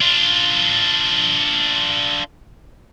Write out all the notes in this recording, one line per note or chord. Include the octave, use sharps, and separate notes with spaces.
D4 F4